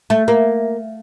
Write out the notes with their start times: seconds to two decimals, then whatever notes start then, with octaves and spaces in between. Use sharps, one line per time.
0.10 A3
0.28 A#3